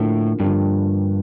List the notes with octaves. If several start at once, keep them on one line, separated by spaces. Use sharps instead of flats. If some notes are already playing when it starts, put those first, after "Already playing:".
Already playing: A2 D3 F3 A#3 D4
G2 D3 F3 A#3 D4